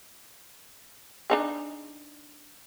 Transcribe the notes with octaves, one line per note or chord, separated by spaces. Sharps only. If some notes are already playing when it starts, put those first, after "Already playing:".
D4 D#4 G#4